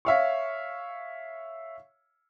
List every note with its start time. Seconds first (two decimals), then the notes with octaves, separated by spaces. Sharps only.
0.05 C#5 E5 F5 C#6